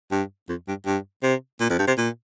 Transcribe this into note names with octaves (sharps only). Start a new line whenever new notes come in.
G2
F2
G2
G2
C3
A#2
F2
G2
C3
A#2